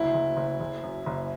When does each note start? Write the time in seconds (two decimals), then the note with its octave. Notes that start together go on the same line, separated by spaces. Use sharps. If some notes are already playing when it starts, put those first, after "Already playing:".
Already playing: F#1 D2 E4
0.14 F#1
0.37 F#1
0.60 F#1
0.83 F#2
1.06 F#1